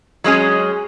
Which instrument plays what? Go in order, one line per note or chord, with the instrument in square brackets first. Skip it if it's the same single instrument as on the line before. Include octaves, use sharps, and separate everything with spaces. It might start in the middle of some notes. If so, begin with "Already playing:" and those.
[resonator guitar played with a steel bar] F#3 G#3 C#4 G#4